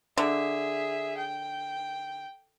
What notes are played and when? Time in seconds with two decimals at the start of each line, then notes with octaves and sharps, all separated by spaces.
0.17 D3 G#4 E5
1.17 G5